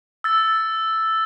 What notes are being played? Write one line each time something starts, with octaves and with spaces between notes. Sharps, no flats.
E6 A6